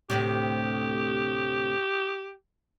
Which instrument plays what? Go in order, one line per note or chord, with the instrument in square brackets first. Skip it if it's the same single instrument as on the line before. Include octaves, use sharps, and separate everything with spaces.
[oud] D2 A2 C3 [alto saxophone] G4